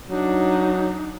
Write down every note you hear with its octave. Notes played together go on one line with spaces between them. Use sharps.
F#3 D4 D#4